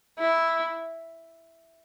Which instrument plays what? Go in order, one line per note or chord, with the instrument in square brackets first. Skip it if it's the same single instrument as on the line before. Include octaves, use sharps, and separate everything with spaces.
[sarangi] E4